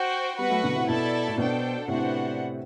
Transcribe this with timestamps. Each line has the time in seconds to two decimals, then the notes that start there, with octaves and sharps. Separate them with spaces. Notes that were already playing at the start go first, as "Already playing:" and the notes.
Already playing: F#4 C5 G5
0.38 G3 B3 F#4 B4 F#5
0.50 F#3 A3
0.63 B2 D3
0.75 A2 C3
0.88 B2 E4 A4 D5 A5
1.27 A2
1.38 B2 D4 A4 C5 G5
1.88 A2 C3 B3 D4 F#4 C5 F#5